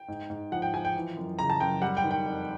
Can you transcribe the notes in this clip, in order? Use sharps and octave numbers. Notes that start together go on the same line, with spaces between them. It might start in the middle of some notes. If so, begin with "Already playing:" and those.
Already playing: G5
G#2
G#2
F3 F#5
G5
F3 G#5
G5
E3
F#2
C#3 A#5
A5
F#2 G5
G3 F#5
G5
D#3
G5
F2